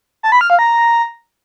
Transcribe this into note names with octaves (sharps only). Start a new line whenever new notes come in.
A5
B5
F6
F5
A#5